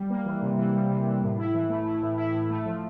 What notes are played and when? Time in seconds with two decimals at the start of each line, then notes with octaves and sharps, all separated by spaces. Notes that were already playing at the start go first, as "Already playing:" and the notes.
Already playing: G3
0.10 A#3
0.26 E3
0.42 C3
0.58 E3
0.74 G3
0.90 C3
1.06 E3
1.22 A2
1.38 E4
1.54 E3
1.69 A3
1.86 E4
2.02 A2
2.18 E4
2.34 A2
2.50 A3
2.65 F3